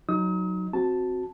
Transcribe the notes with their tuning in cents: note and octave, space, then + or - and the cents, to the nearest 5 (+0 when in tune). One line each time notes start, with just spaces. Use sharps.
F#3 +0 D#4 +0 D#6 +40
C4 +0 F#4 +0 A5 +0